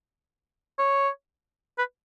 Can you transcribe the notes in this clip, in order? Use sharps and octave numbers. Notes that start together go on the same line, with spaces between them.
C#5
B4